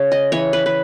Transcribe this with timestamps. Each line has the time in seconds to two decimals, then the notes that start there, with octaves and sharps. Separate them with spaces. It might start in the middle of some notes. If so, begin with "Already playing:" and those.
Already playing: C#3 C#5
0.12 D#5
0.32 E3 C#5
0.53 B4
0.66 B4